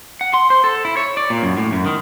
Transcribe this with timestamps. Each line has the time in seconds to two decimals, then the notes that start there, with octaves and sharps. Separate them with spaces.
0.21 F#5
0.33 C6
0.50 C5
0.64 A4
0.85 E4
0.97 C#5
1.17 D5
1.30 A#2
1.43 F#2
1.57 A2
1.72 F#2
1.86 D#3